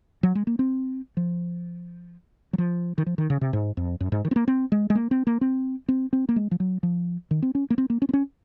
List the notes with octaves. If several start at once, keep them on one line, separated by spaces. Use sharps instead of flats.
F#3
G#3
A#3
C4
F3
F#3
F3
D#3
F3
D#3
C#3
C3
G#2
F2
F#2
G#2
D#3
C4
A#3
C4
G#3
G#3
A#3
C4
A#3
C4
C4
C4
A#3
G#3
F3
F#3
F3
D#3
C4
C#4
A#3
C4
A#3
C#4
C4
C#4